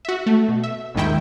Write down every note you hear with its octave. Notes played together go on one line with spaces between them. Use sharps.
F#4 E5
A3
B2
E5
A#1 D#2 G#2 D#3 E4 G5